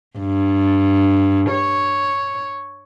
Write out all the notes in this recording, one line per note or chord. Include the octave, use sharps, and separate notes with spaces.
G2
C#5